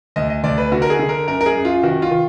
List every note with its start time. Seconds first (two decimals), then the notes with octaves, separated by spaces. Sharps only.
0.16 D2 D#5
0.30 D#5
0.44 D2 D5
0.58 B4
0.72 D3 F#4
0.82 A#4
0.90 G#4
0.99 D3
1.09 A#4
1.27 F#2 A#4
1.41 A#4
1.46 G#4
1.55 F#2
1.65 F4
1.83 D#3 F#4
2.02 F4
2.11 D#3